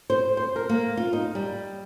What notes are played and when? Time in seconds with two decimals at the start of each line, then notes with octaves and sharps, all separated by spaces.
0.10 C5
0.37 C5
0.56 A#4
0.69 A#3
0.97 F4
1.13 D#4
1.35 G3